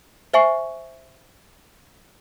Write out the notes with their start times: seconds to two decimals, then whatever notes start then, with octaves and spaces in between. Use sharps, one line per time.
0.33 C5 E5 G#5 C#6 C7